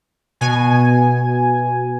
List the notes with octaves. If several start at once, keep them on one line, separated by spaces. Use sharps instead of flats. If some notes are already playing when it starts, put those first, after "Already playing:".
B2 G#5